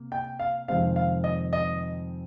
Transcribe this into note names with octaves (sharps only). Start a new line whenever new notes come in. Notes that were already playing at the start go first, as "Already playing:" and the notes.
Already playing: C3 A#3
G5
F5
F2 C3 D#3 G#3 C4 F5
F5
D#5
D#5